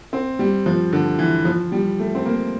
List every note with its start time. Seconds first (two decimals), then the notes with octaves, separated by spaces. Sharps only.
0.13 C4
0.39 G3
0.66 F3
0.93 D3
1.19 E3
1.45 F3
1.72 G3
2.00 A3
2.15 C4
2.26 A#3